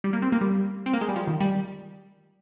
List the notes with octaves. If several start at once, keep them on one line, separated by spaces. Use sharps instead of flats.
G3
A#3
C4
A#3
G3
C4
A#3
G#3
G3
F3
D#3
G3